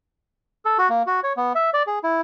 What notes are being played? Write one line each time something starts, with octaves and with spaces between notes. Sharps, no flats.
A4
F#4
A#3
F#4
C#5
B3
E5
D5
G#4
E4